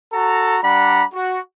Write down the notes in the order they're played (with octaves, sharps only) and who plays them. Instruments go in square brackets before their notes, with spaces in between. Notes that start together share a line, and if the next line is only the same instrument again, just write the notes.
[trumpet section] F#4 A4 A#5
G3 D4 F#5 A#5 B5
F#4